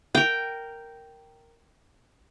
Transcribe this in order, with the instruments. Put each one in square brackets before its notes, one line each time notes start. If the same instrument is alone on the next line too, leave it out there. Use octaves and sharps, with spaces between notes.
[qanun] A#4 G5